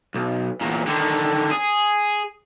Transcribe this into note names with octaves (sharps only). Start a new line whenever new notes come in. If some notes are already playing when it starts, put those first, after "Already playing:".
B1
E2 A#2
D3 D#3
G#4